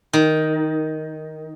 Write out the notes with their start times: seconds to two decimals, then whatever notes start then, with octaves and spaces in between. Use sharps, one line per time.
0.13 D#3